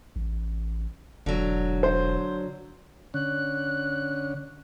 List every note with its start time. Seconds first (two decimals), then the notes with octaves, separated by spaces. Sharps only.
0.16 A1
1.26 E1 D3 F#3
1.83 C5
3.14 D3 C#4 F#6